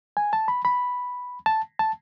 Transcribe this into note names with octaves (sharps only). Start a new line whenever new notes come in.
G#5
A5
B5
B5
A5
A5